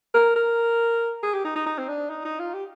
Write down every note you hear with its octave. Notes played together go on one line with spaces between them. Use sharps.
A#4
A#4
G#4
G4
D#4
D#4
D#4
C4
D4
D#4
D#4
F4
G4